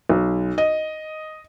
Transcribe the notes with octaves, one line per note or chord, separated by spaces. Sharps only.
B1
D#5